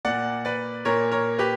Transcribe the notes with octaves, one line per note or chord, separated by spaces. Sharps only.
A#2 A#3 D5 F#5
B4 D5
A#2 A#3 A#4 C#5
A#4 C#5
G4 B4